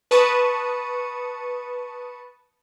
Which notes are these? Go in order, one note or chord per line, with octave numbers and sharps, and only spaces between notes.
B4 A5 C#6 D#6 C#7 D#7